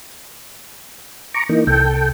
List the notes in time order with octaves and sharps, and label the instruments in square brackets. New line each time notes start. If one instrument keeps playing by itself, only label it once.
[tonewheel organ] A#5 C#6 D6
E3 A#3 D#4
[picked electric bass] C2 [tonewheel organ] A4 G5